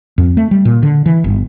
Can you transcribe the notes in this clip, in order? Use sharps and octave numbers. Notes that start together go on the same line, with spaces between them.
F2
A3
G3
A#2
D3
E3
G1